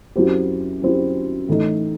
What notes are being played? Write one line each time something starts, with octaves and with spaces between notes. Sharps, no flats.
F#2 F#3 C4 E4 G4
F#2 F#3 C4 E4 G4
A2 E3 A3 D#4